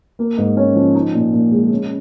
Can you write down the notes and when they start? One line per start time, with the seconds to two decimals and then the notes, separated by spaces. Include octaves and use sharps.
0.19 A#3
0.38 G#2
0.57 C#4
0.76 F3
0.95 D#4
1.14 A#2
1.33 A#2
1.52 G#3
1.71 C#4